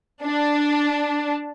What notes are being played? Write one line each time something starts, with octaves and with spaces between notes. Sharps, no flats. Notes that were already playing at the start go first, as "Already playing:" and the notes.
D4